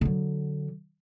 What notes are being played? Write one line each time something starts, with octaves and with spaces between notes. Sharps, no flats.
D3 F#3